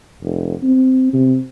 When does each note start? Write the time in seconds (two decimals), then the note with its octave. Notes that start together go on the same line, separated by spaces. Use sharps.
0.22 F1
0.63 C4
1.14 C3